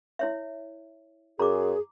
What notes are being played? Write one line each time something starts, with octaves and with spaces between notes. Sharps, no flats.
E4 C#5 E5
F#2 G#4 A#5 D6